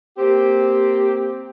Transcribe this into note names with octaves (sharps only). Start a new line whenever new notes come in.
A#3 C4 G4